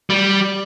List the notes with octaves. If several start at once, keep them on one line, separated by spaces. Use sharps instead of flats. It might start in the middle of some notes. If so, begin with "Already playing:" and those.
G3